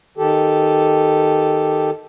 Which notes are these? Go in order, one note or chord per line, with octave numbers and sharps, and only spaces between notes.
D#3 G4 A4